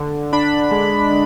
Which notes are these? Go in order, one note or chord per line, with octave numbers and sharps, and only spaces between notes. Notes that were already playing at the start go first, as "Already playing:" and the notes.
Already playing: D3
D4 B5
G#3
D3